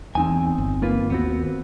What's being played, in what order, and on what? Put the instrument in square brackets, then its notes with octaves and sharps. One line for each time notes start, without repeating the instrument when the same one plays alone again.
[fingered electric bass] E2 [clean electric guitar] C4 D#4 G#5
[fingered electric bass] G1
[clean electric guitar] A#3 F4 B4
[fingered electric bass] D#2 [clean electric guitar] B3 C4 F#4